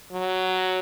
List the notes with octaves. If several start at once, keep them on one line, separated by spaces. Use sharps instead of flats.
F#3